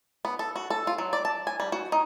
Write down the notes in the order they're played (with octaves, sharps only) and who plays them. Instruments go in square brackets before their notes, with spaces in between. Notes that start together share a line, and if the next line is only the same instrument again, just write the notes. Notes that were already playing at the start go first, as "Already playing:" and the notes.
[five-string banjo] B3
A4
F#4
A4
F4
F#3
D5
A5
G#5
G3
F#4
D#4